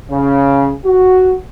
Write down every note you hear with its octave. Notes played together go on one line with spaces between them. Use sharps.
C#3
F#4